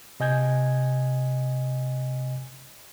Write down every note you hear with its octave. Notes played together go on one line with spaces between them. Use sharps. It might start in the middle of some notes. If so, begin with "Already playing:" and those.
C3 D#5 G#5 G6 G#6